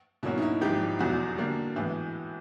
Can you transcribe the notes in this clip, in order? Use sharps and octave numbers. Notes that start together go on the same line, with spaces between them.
B2 F#3 A#3 C#4 E4 F#4
D#4
E4
G#1 G#2 F3 G4
F1 E2 B2 F#3 F#4
D3 G3 A#3 D4
A2 E3 G#3 B3